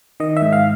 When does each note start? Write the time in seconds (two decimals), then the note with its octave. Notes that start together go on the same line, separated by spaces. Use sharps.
0.20 D#3 D#5
0.37 E5
0.42 G#2
0.53 F5